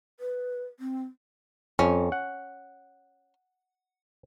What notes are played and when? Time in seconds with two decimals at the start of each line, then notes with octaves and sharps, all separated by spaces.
0.20 B4
0.80 C4
1.79 F2 C#4
2.12 F#5